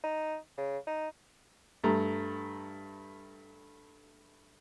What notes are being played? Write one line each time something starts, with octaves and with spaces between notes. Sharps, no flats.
D#4
C#3
D#4
G2 A3 A#5